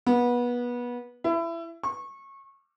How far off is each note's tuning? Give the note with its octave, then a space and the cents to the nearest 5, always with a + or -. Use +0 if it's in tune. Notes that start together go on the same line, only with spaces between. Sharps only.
B3 -25
E4 +25
C#6 -25